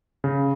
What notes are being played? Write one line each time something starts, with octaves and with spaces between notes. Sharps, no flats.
C#3